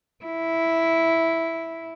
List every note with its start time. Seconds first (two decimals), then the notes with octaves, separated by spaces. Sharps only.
0.24 E4